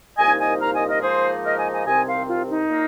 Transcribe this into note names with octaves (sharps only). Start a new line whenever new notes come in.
C2 A#2 F3 A#3 D#4 D#5 G#5
D#5 G#5
F5 A#5
D#5 G#5
A#4 D#5
G#2 F3 A#3 D#4 G#4 C5
A#4 D#5
D#5 G#5
D#5 G#5
C2 C3 D#3 C4 D#5 G#5
C5 F5
F4
D#4
A#2 A#3